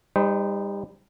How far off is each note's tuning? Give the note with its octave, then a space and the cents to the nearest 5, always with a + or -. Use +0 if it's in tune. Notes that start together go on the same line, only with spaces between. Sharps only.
G3 +30 D#4 +0 C5 -20